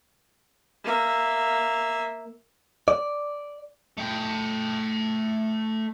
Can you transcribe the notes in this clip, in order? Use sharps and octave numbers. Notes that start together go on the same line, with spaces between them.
A#3 E5
D5
A3 G5